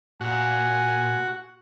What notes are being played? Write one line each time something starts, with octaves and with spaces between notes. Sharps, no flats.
A#2 F#4 G#5